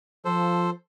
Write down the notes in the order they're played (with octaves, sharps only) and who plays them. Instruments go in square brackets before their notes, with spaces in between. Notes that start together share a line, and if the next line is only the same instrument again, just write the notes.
[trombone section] F3 [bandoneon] A4 C5